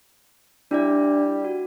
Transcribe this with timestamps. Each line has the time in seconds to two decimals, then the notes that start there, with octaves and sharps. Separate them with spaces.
0.71 G3 D4 E4 D5
1.45 F#4